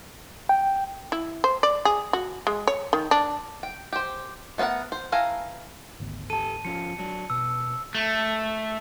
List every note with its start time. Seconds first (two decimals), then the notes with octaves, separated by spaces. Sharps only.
0.49 G5
1.12 E4
1.44 C5
1.63 D5
1.85 G#4
2.13 F#4
2.47 G#3
2.67 C#5
2.93 D#3
3.11 D4
3.63 G5
3.93 G4 C5
4.58 A3 B3 D4 A#4 F#5
4.92 C5
5.12 E3 A4 F5 G#5 A#5
6.00 G#1 D2 B3
6.30 G4 A4 A5 D#7
6.65 F3 C#4 F4 C#7
6.99 F#3 G#3 D4
7.30 B2 E6
7.95 A3